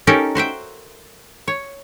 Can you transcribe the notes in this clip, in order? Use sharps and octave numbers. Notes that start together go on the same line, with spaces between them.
C#4 D#4 G4 A4 A#4
F#4 C5 E5 G5
C#5